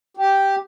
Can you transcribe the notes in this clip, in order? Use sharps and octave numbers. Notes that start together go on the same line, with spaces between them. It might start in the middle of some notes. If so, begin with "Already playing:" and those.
G4